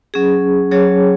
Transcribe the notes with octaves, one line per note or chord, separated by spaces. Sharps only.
F#3 C#4 G#4
F#3 C#4 G#4 C#5